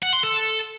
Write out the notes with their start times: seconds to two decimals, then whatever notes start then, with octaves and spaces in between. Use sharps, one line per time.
0.02 F#5
0.13 C6
0.23 A4